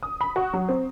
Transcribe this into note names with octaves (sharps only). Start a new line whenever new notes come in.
D#6
B5
F#4
F#3
C4